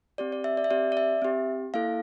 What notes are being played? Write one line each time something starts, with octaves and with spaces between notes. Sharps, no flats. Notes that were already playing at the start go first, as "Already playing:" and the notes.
C4 G4 D5
D5
E5
D5
E5
C4 G4 D5
D5
E5
C4 G4
A#3 E4 A4 F5